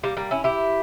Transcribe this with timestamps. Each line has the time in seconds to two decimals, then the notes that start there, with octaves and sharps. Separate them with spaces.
0.03 G3 A#3
0.17 G3 A#3
0.31 C#4 E4
0.44 E4 G4